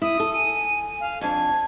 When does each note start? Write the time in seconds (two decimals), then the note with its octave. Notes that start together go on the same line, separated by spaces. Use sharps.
0.02 E4 D#6
0.20 A4
0.33 G#5 D#7
1.00 F5
1.21 F2 D4 A5 G#6